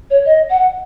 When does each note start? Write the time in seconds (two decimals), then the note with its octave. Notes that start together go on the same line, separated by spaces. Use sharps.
0.10 C#5
0.26 D#5
0.50 F#5